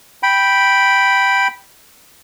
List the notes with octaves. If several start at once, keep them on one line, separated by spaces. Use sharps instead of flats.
G5 B5